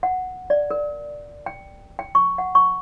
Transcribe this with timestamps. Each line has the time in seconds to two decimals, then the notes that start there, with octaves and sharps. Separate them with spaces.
0.03 F#5
0.50 D5
0.71 A#4
1.46 G5
1.99 G5
2.15 C#6
2.38 F#5
2.55 C#6